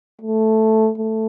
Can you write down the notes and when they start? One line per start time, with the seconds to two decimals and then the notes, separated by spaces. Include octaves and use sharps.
0.21 A3
0.98 A3